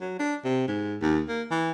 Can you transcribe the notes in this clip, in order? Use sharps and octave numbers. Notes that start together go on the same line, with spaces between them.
F#3
D4
C3
G#2
D#2
A#3
E3